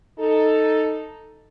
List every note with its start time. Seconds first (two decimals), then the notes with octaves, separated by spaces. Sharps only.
0.19 D#4 A4